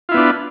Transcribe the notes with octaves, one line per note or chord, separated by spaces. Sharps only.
B3 D4 E4 F4